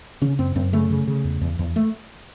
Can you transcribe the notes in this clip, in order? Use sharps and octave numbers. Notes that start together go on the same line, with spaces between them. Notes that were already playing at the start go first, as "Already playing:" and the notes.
C#3 C#4
F#2 C4
F#2 C4
C#3 A3
C#3
C#3
E2
E2
E2
A3